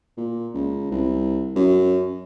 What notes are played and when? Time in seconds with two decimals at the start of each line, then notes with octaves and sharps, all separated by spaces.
0.17 A#2
0.54 C#2
0.91 C2
1.56 F#2